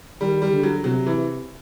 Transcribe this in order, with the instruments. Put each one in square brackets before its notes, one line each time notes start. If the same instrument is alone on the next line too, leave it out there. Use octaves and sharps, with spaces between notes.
[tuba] D#3 [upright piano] G3
[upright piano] G3
[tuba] D3
[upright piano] F#3
[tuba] C3 [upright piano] F#3
[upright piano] E3